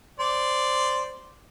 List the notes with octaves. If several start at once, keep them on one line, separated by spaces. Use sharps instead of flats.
C5 D5